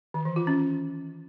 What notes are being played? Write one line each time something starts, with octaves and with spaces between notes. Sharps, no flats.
D#3
E3
F4
C#4